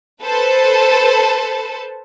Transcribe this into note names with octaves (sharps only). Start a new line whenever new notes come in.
A4 B4 C5 A5